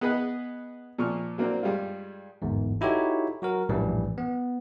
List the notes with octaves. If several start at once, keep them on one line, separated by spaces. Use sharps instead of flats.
B3 G#4 B4 D#5 B5 F#6
A#2 F3 C#6 F6
F#3 A#3 C4 D4
G2 G3 G#3 F4
G1 E2 G#2
D#4 E4 F#4 G4 A4 C#5
F#3 F#4 A#4
A#1 F#2 A2 E3 G3
B3